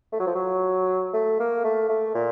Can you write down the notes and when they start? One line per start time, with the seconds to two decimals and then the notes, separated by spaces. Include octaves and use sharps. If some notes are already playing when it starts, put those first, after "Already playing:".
0.12 A3
0.20 F#3
0.27 F3
0.35 F#3
1.14 A3
1.40 A#3
1.64 A3
1.89 A3
2.15 A#2